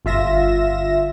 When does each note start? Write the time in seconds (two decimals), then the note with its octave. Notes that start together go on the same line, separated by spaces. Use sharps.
0.05 G1 F4 E5 A#6 E7